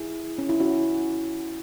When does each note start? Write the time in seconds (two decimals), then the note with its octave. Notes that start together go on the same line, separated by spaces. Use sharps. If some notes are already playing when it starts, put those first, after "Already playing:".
Already playing: E4 G#4
0.38 C#4
0.49 E4
0.60 C#4 F#4